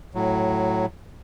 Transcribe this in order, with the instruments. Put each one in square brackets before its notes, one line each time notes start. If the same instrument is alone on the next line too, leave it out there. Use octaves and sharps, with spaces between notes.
[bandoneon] A2 F#3